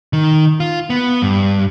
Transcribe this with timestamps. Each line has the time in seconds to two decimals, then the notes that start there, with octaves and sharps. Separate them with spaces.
0.13 D#3
0.60 F4
0.90 B3
1.22 G2